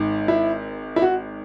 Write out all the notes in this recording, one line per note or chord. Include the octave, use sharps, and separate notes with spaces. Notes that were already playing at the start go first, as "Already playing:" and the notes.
Already playing: G#1 G#2 D#3
E4
E4
F#4